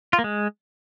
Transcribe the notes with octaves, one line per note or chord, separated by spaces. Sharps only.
F4
A#3
G#3